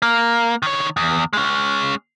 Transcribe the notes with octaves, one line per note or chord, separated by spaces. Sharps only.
A#3
D#3 C#5
E2
G#3 C#4